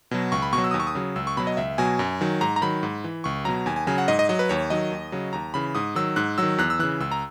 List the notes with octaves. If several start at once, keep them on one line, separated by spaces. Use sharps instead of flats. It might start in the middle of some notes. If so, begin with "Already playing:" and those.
B2 F#3
C#2 C#6
B5
B2 C#6
F#3
E6
D#2 D#6
C#6
D#6
C#3 F#3
C#2 E6
C#6
B2 F#3 B5
D#5
C#2 E5
B2 F#3 G#5
F#2
D#3 F#3
G#2 A#5
A#5
D#3 F#3 B5
G#2
E3
C#2 C#6
B2 F#3 A#5
D#2 G#5
G#5
C#3 F#3 G#5
F#5
G#2 D#5
D#5
F#3 D#5
B4
D#2 C#5
D#3 F#3 D#5
D#2
C#3 F#3
D#2 A#5
C#3 E3 B5
G#2 D#6
D#3 F#3 E6
G#2 F#6
D#3 F#3 E6
E2 F#6
E6
C#3 E3 F#6
C#2 E6
A#5